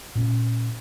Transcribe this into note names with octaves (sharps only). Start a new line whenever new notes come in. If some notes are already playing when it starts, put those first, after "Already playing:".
A#2 C#4